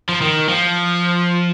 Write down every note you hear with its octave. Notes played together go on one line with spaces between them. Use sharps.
F3
D#3
F3